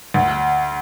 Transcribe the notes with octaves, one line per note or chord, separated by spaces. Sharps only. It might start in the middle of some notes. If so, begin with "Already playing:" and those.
D2